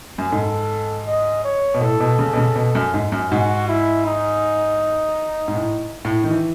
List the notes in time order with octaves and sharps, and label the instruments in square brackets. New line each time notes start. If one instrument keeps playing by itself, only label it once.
[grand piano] F#2
[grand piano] G#2 [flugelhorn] A4
[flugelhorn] D#5
C#5
[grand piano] B2
[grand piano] A2 [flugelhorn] A4
[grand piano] B2
C#3
B2
C#3
B2
F#2
G#2
F#2
[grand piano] G#2 [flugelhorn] F#4
[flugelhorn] E4
D#4
[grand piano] G#2
A2
A2
D#3
E3